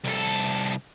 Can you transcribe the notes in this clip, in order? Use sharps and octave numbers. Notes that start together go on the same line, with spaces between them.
C2 A4